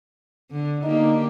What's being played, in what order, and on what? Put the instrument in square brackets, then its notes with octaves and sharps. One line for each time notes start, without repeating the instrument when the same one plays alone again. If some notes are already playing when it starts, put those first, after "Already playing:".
[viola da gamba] D3
[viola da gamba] D3 A#3 G4 [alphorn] D#4